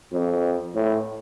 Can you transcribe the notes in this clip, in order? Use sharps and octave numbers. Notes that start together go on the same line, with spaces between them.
F2
A2